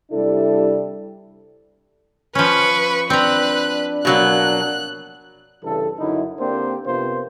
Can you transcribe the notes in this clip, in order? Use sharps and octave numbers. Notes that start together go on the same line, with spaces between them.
C3 G3 D4 E4 A4
F3 C#4 B4 C#6
C4 D4 B4 A#5 F#6
B2 F#3 A#3 F#6
G2 C#3 E3 A4
F#2 D3 D#4 E4
D3 A#3 C4 D4 G4 C5
F2 C3 A#3 B3 F4 C5